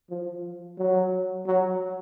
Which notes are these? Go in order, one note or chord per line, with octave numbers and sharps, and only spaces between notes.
F3
F#3
F#3